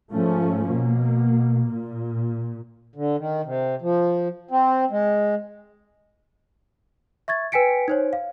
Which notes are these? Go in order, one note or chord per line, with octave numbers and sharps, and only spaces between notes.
G#2 F3 A3 C#4
B2 A#3
A#2
D3
D#3
C3
F3
C4
G#3
E5 C#6 G#6 A6
B4 G5 G#5 B6 C#7 D7
D#4 C5 C#5
F5